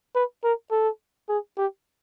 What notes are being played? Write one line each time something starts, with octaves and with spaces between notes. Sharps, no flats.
B4
A#4
A4
G#4
G4